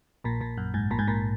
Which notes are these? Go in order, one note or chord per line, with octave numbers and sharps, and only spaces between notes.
A#1 A#2
A#1 A#2
F#2
G#2
A#1 A#2
G#2
A#1 A#2